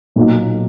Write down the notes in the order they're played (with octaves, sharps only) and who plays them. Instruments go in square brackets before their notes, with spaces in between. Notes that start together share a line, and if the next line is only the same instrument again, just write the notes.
[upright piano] B1 A#2 F#3 A#3 D#4